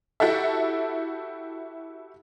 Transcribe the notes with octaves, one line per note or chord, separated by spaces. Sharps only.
E4 F#4 G4 A4 E5